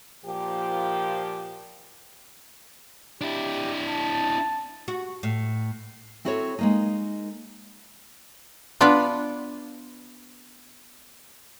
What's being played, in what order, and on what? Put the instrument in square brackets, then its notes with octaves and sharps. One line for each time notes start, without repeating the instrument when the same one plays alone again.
[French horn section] A#2 F3 G4
[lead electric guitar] D4 E4 [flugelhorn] G4
[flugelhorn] A5
[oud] F#4
A2
[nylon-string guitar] C4 E4 F#4 A4 C5 C#5
G#3 A#3 D#4
[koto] B3 D4 F4 B4 D5